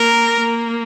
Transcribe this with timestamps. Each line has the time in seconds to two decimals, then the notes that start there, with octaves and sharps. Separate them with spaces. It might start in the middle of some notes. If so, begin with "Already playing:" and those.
Already playing: A#3 A#4
0.42 A#3